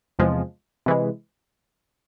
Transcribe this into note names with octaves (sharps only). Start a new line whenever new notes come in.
E2 C3 F3 G#3
C3 E3 G#3